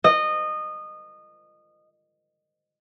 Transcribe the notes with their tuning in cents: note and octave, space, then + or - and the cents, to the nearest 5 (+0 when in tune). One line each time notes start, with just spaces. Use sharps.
D#5 -20